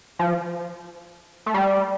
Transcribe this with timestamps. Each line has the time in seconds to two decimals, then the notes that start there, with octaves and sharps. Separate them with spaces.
0.19 F3
1.46 A3
1.54 G3